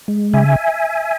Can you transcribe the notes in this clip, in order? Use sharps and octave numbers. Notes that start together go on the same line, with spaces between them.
G#3
C#3 E5 G#5